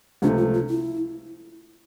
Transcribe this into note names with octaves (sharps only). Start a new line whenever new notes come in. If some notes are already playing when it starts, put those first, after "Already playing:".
C#2 C3 F3 A3 D4
F4
F4
E4